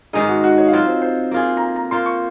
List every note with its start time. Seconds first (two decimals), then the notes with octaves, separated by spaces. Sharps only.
0.13 G#2 D#3 G#3 D#4 G#4
0.28 F#4
0.44 F#4
0.58 C#5
0.68 F5
0.73 F#3 C4 F4 D#5
0.87 C5
1.02 C5
1.31 A#3 F4 G#4
1.57 A#5
1.62 G#5
1.76 A#5
1.91 A#3 F4 C5 C6
2.06 C#6